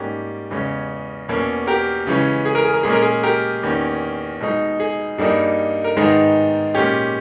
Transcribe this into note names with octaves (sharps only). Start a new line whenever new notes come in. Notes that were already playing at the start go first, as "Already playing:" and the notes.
Already playing: G#2 G3 A#3 C#4 G4
E2 C#3 G#3 C#4
E2 B2 A#3 C#4
G4 A#4
C#3 E3 G#3 C#4
G#4
A#4
G#4
A#4
A#2 G#3 C#4 G#4
A#4
G#4
G4 A#4
E2 D#3 A#3 C#4
B2 G#3 D#4
G#4
G2 G3 A#3 D#4 G#4
A#4
G#2 D#3 G#3 B3 D#4 G#4
A#2 G#3 C#4 G4